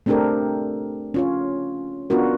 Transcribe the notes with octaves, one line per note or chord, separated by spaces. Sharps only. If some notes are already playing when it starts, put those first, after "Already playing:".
A3 C4 D4 G4 A4 A#4
C#4 F4 C#5
B3 C#4 D4 F4 F#4 A#4